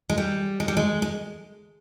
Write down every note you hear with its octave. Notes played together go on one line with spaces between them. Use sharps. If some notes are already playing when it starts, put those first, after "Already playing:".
G#3
G3
G#3
G3
G#3
G#3